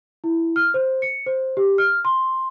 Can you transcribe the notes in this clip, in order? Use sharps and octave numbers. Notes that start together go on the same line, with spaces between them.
E4
F6
C5
C#7
C5
G4
F6
C6